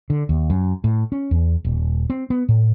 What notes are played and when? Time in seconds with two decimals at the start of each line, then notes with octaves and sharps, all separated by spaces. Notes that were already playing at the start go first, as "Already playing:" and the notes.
0.10 D3
0.29 D#2
0.50 F#2
0.84 A2
1.12 C#4
1.31 E2
1.65 D#1
2.10 C4
2.30 B3
2.49 A2